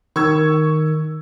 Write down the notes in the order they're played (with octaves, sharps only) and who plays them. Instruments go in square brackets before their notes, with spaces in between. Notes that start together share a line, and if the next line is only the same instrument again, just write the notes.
[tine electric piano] D#3 [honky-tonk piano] C#6 E6 G#6